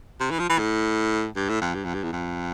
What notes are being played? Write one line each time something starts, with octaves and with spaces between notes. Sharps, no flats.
C3
E3
F3
E3
A2
G2
A2
F2
G2
F2
G2
E2
F2